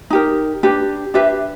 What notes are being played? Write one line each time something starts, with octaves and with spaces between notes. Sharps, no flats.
D#4 G4 A#4
D4 G4 B4
D4 G4 B4 E5